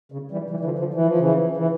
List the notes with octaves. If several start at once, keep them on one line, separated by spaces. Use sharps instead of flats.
C#3
E3 G3
E3 G3
E3
D3 F3
D3 F3
E3
F3
C#3 E3
E3